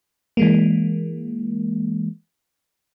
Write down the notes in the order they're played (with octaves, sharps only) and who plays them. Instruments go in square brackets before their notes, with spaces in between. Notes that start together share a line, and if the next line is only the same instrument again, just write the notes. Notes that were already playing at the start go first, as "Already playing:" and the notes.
[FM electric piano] E3 G#3 A#3